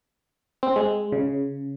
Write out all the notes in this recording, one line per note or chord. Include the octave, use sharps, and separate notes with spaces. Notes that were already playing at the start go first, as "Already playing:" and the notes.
C4
G#3
C#3